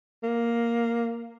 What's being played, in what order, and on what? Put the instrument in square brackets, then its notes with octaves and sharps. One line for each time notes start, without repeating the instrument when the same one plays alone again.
[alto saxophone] A#3